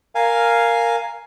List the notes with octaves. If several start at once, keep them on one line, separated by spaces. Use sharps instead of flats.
A#4 F5 G#5